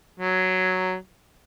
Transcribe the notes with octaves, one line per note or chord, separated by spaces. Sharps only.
F#3